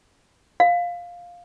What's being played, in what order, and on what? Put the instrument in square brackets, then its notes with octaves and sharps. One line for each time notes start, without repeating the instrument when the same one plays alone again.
[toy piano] F5